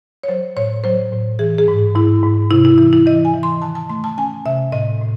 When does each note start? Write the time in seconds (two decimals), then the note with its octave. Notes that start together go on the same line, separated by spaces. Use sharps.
0.23 C#5
0.28 F#3 C5
0.57 A2 C#5
0.84 F#3 C5
1.12 A2
1.39 E3 G#4
1.58 G#4
1.68 G#2
1.95 G#2 E4
2.23 G#2
2.51 C3 E4
2.65 E4
2.78 E3 E4
2.93 E4
3.06 E3 D#5
3.25 G#5
3.34 E3
3.43 C6
3.62 D#3 A5
3.75 A5
3.89 A3 C6
4.04 A5
4.18 C#4 G#5
4.46 C3 E5
4.72 A2 D#5
5.01 A2